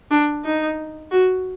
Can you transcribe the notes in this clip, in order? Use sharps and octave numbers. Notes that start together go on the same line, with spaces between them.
D4
D#4
F#4